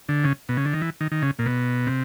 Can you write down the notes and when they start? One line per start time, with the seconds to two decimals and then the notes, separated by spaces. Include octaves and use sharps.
0.09 D3
0.24 C#3
0.49 B2
0.57 C#3
0.66 D3
0.73 D#3
0.82 E3
1.01 D#3
1.12 D#3
1.22 C#3
1.39 A#2
1.46 B2
1.87 C3